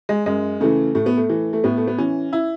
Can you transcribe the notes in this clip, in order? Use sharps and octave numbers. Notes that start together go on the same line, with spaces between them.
G#3
F#2 G#3
C#3 E3 A3
A2 A3
B3
A3
E3
A3
A2 B3
A3
B3
E3 C#4
E4